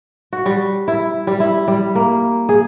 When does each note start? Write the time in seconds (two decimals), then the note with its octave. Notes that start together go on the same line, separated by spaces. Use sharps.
0.33 F#4
0.46 G3
0.88 E4
1.27 G3
1.40 E4
1.68 G3
1.95 A#3
2.49 G#4